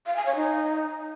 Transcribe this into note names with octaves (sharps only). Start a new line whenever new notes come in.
F5
G#5
C#5
D#4